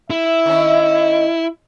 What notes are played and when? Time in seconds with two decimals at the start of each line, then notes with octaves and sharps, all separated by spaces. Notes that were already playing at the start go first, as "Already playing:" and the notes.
0.10 E4 E5
0.46 D#3 C#4